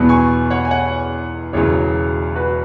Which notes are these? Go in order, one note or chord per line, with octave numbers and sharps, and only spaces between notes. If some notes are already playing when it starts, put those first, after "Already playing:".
Already playing: E2 B2 F#3 B3
G#5 C#6
C#5 F#5
G#5
C#5 F#5
E1 E2 C#3 F#3 G#4 C#5
F#4 B4